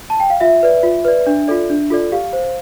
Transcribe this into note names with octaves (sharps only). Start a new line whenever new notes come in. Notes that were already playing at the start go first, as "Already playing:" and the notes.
A5
G5
F5
F4 E5
B4 D5
F4
B4 D5
D4
F4 A4 D5
D4
F4 A4 D5
G4 F5
C5